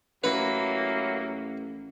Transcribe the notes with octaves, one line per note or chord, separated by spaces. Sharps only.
A1 E3 F#3 A#3 B4 B5